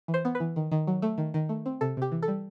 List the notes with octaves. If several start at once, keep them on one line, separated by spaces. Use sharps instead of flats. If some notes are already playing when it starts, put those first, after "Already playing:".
E3
C5
B3
B4
E3
D#3
D#3
F#3
A3
D#3
D#3
A3
C4
C3 A4
C3 G4
E3
A4
G3